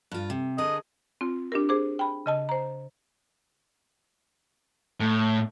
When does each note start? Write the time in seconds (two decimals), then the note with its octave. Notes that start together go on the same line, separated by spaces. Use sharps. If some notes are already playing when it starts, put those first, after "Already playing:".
0.12 G2 F4
0.30 C3
0.58 D3 G#4 A#4 D#5
1.21 C4 F4
1.52 D4 G4 A#4
1.69 G#4 C5 D6
1.99 G5 B5
2.26 C#3 D#5 A5
2.49 C5 A#5
5.00 A2